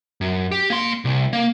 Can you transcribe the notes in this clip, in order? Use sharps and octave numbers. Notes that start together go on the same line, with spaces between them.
F#2
G4
A#3 C6
C2
A#3